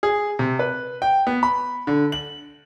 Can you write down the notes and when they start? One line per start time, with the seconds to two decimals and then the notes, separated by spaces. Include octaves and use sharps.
0.03 G#4
0.39 C3
0.59 B4
1.02 G5
1.27 B3
1.43 B5
1.87 D3
2.12 F#7